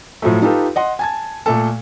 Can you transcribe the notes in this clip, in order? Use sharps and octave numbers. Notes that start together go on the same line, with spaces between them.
A2 F3 F#3 A3
D#4 F4 G4 A4 B4
D#5 F#5 C6
G#5 A5 G#6
A#2 A3 A4